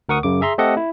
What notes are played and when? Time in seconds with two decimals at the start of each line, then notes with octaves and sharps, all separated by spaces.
0.09 D2 A#4 F#5 C#6 D#6
0.23 F#2 C#3 D6
0.41 G#4 E5 A#5 C6
0.58 A3 C4 G4 A4 D#5 F#5
0.77 E4